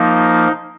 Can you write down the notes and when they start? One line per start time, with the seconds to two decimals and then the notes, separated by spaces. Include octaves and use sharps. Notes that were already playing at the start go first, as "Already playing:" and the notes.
Already playing: F3 A#3 D#4